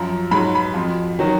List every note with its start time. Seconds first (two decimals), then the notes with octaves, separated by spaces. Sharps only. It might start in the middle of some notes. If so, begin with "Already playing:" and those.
Already playing: F#2 F3 A#5
0.31 G#2 F#3 B5
0.55 B5
0.74 F2 F3
1.19 D#3 F#3